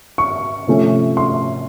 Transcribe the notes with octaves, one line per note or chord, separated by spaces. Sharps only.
C#6
C3 F3 A3 C#4
C6